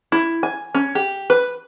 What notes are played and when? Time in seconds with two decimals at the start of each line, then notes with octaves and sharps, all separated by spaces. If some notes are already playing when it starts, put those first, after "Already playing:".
0.12 E4
0.43 G#5
0.75 C#4
0.95 G4
1.30 B4